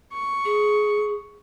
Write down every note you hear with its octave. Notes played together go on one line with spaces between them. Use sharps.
C#6
G#4